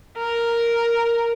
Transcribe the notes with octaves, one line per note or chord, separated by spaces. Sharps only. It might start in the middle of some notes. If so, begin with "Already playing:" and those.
A#4